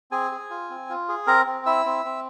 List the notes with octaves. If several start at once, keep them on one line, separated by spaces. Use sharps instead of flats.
C4 G#4 G#5
G#4
F4
C4
F4
G#4
C4 A#4 A#5
C4
E4 E5 E6
C4
C4